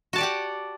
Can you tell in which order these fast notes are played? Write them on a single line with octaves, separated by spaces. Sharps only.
F#4 A5 D5 G4 F#5